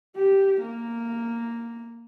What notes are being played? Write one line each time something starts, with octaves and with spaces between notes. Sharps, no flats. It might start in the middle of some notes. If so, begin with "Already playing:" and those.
G4
A#3